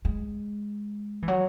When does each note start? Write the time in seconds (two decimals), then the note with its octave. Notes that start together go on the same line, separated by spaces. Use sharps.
0.05 G#3
1.22 E3
1.28 F#3